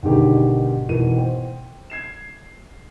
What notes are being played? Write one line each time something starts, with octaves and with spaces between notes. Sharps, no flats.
G#1 B2 D3 D#3 G4 G#4
G#1 B2 E3 A#4 D#7
C5 G5
G#6 C7 E7